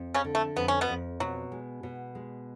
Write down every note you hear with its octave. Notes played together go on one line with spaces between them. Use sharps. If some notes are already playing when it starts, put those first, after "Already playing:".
Already playing: F2
C#3 C#4
D3
A3
F2 B3
C#4
B2 B3
F2
B2 F#3
G#3
B2
G#3